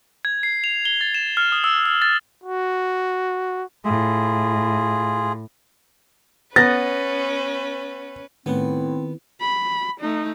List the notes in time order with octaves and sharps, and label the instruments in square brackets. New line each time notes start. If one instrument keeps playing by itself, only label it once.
[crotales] G#6
C7
F7
G7
A6
E7
F6
D#6
E6
E6
A6
[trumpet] F#4
[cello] A2 [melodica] F4 G#4
[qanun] B3 [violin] C#4 B4 [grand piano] A6 A#6
[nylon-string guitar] A2 [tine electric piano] D#3 B4 [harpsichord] B3 [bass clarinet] C4
[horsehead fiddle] B5
A3 D#4